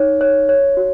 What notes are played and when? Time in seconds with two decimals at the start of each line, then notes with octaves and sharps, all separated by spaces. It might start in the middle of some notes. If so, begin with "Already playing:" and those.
Already playing: D#4 C#5
0.21 C#5
0.49 C#5
0.77 F#4